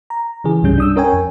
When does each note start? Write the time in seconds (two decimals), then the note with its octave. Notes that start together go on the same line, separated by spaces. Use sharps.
0.10 A#5
0.44 C#3 E3 G#4
0.63 C2 G2 G3 C#4 G6
0.78 D4 D#6 E6
0.96 C#4 A#4 C#5 G5 G#5
1.13 F2